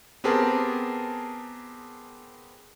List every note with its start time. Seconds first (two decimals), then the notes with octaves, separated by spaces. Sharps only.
0.24 B3 C4 G4 G#4 A#4 A5